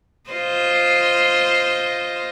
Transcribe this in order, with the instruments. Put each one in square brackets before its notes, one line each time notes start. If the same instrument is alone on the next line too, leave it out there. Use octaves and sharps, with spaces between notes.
[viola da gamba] F4 C5 D#5